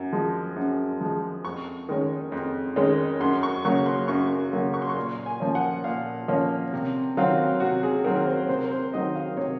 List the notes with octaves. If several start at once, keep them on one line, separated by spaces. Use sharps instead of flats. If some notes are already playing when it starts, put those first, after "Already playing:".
Already playing: F#2
F3 G#3
F#2
F3 G#3
F2 C#6
D#3 G#3 C#4
F2
D#3 G#3 C#4
F#2 C6
C#6
C#3 F#3 A#3 C#6
C6
F#2 C#6
C#3 F#3 A#3
C#6
C6
C#6
A#2 C6
G#5
F3 A#3 C#4
F#5
A#2 F5
F3 A#3 C#4
C3
D#3 F#3 C4 F4
C3 F#4
G#4
D#3 F#3 C4 A#4
A#4
C5
C3 C5
A#4
C5
D#3 F#3 C4 D#4 D#5
F5
C3 C#5